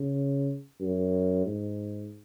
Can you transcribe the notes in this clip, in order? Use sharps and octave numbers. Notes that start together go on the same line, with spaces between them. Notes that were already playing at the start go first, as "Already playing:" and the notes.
Already playing: C#3
F#2
G#2